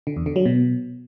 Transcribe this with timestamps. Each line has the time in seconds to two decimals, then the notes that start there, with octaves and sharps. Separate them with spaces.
0.07 D3
0.17 E2
0.26 D3
0.36 F#3
0.45 B2